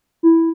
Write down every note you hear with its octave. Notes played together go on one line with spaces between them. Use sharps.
E4